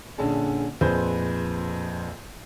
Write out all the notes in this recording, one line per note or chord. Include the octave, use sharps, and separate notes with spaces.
A#1 D3 C#4 G#4 A5
A#1 F2 G#4 B4 C5 G6